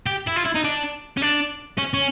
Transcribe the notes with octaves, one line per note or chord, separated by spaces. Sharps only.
G4
E4
F4
E4
D#4
D4
C#4
D4
C#4
C#4